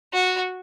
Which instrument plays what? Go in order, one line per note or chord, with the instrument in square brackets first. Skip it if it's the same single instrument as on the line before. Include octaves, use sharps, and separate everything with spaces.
[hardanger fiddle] F#4